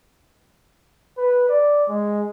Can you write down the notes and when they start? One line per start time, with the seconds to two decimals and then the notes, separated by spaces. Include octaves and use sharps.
1.18 B4
1.49 D5
1.89 G#3